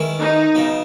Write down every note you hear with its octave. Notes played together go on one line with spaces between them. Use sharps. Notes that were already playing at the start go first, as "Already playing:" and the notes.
Already playing: D#3 G#3 C#4 E4 B4
D#4
C#3 F#3 B3